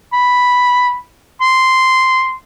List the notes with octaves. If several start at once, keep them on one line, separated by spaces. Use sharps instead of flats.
B5
C6